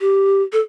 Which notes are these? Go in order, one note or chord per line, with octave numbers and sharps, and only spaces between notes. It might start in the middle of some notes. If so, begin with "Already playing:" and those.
G4
A4